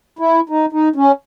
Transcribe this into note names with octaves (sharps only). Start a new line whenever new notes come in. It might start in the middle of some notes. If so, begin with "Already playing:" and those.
E4
D#4
D#4
C#4